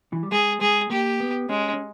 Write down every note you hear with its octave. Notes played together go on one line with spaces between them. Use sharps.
E3
G3
G#3 G#4
G#3 G#4
A#3 G4
B3
G#3 C#4
C#4